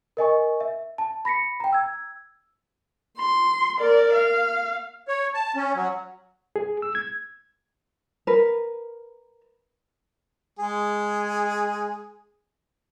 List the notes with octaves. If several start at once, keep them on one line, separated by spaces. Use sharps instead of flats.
A#4 D#5 G#5 C#6
E5
A5
B5 A#6 B6 C#7
G5 A#5
E6 G#6
C6
A#4 D5
F5
C#5
A5
C#4
F#3
G#4
E6
G#6
A#4 B4
G#3 G#4